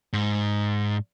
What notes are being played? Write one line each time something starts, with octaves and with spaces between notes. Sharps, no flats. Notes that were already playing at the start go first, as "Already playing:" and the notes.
G#2